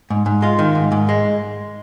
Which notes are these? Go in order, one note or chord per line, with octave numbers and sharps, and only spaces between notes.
G#2
G#2
G#3 F4
D#3
G#2
G#2
G#3